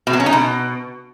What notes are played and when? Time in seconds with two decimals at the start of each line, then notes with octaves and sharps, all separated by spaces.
0.07 B2
0.13 F#3
0.20 C#4
0.26 D#4
0.33 B2